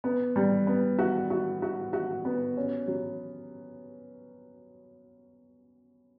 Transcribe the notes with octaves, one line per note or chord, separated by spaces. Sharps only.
B3
G3
B3
F#4
F#4
F#4
F#4
B3
C#4
F#3